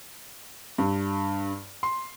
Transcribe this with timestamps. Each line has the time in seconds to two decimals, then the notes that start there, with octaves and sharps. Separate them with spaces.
0.78 G2
1.83 C6